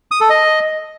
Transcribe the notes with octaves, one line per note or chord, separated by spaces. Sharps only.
D#6
A4
D#5